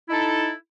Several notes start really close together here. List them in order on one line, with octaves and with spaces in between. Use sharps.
E4 D#4 A4